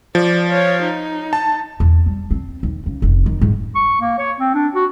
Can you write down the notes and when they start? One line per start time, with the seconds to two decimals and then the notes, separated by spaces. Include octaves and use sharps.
0.15 F3 D5
0.49 C#5 F5
0.83 D#4
1.33 A5
1.80 E2
2.06 G3
2.31 C4
2.63 D#2
2.86 C#2
3.02 F1
3.26 D#3
3.41 G#2
3.75 C#6
4.01 A#3
4.18 C#5
4.40 C4
4.54 D4
4.75 F#4